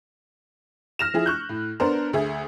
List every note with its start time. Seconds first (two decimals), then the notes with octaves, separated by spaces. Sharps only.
0.99 F6 A#6 E7
1.14 F3 E4 G#4
1.26 C#6 F#6 G6
1.49 A2
1.80 B3 D4 A#4 C5
2.13 D2 G#4 E5